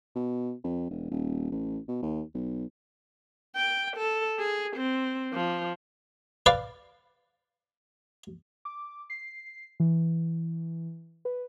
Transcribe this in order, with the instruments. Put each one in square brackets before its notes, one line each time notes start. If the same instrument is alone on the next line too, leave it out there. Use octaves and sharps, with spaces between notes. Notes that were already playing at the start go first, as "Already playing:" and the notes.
[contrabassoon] B2
F2
E1
D#1
A1
B2
D#2
B1
[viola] G5
A4
G#4
C4
F3
[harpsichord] B4 D5 F5
[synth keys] D6
C7
E3
B4